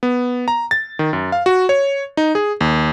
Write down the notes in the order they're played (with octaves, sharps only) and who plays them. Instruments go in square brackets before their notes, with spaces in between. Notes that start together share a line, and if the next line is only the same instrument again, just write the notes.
[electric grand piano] B3
A#5
A6
D#3
F#2
F5
F#4
C#5
D#4
G#4
D#2